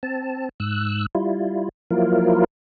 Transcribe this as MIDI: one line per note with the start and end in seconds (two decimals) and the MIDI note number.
0.03 0.49 60
0.03 0.49 81
0.60 1.06 44
0.60 1.06 88
0.60 1.06 90
1.15 1.69 55
1.15 1.69 64
1.15 1.69 65
1.91 2.44 53
1.91 2.44 54
1.91 2.44 58
1.91 2.44 64
1.91 2.44 65
1.91 2.44 70